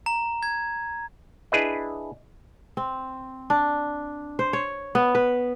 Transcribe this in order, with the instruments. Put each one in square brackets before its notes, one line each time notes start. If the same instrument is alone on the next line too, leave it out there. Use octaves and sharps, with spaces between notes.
[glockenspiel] A#5
G#6
[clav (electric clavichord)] D4 E4 G#4 B4 D#5
[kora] C4
D4
C5
C#5
B3
B4